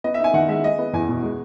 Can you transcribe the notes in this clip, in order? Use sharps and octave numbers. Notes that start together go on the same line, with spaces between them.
B3 D#5
E5
D#4 G#5
D#3 F#5
G#3 E5
G#3 D#5
B3
E2 G#5
B2
G#3